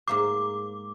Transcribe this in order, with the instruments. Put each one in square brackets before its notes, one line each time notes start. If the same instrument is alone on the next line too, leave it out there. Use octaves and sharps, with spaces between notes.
[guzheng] G#2 A#3 C5 [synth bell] D6